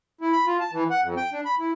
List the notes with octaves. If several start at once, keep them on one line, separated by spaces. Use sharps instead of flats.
E4
B5
F4
A5
E3
F#5
F2
G5
D4
B5
E4